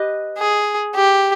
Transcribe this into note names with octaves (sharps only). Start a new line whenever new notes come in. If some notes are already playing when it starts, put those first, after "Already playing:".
Already playing: G4 B4 D#5
G#4
G4